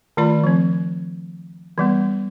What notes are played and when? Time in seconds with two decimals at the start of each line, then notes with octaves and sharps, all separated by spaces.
0.17 D#3 A3 F4 D5 B5
0.44 F3 C4
1.78 E3 G3 B3